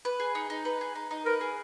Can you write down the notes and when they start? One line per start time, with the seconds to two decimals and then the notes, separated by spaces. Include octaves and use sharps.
0.05 B4
0.20 G#4
0.35 D#4
0.50 D#4
0.65 B4
0.81 G#4
0.95 D#4
1.11 D#4
1.25 A#4 B4
1.41 G#4